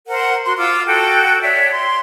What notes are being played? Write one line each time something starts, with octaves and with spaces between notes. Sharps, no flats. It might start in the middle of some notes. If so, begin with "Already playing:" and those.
A#4 C5 F#5
F#4 C6
F4 F5 D6 E6
F#4 A4 G5
C#5 D5 E5
C6